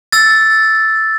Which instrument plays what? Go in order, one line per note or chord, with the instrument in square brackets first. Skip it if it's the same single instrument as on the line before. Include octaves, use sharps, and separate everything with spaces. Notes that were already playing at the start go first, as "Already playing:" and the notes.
[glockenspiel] E6 A6